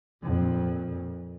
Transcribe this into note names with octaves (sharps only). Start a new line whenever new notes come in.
F2 A#2